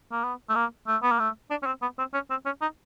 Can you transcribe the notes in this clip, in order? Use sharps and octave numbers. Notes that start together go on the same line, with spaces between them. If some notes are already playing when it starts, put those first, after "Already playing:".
A#3
B3
A3
A#3
A3
B3
A#3
A3
D4
C#4
C4
B3
C4
C#4
C4
C#4
D#4